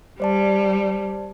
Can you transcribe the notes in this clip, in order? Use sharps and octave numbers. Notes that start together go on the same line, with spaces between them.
G3 C5 D5 A5